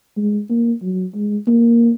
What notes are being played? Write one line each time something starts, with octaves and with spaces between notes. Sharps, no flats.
G#3
A#3
F#3
G#3
A#3